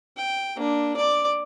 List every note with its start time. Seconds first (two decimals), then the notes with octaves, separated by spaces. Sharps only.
0.17 G5
0.56 A#3 D4
0.97 D5 D6